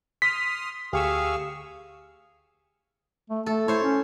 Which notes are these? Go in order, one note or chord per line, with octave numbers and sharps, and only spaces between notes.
C6 D#6 F6 B6
D2 G4 G#4 F5 C#6 E6
A3
A3 A4
E4 C5 C#5
C#4